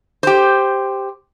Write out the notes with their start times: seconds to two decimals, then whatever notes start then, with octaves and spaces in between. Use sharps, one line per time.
0.23 G4 C5